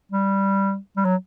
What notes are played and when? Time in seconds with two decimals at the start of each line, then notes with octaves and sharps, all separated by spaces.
0.12 G3
0.96 G3
1.05 F#3